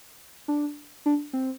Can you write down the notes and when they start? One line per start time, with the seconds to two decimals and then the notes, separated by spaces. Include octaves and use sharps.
0.48 D4
1.06 D4
1.33 C4